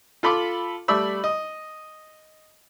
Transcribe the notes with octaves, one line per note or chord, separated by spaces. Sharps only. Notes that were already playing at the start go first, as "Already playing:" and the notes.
F4 A4 B5 C6 D6
G3 A3 D5 E5 B5 E6
D#5